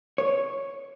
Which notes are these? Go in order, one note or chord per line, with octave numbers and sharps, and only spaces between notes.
C#5